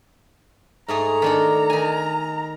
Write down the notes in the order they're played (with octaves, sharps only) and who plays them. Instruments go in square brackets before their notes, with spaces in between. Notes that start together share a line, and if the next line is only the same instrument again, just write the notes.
[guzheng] G#2 A3 G#4 [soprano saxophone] A#5
[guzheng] D#3 D4 A4
D#3 G#5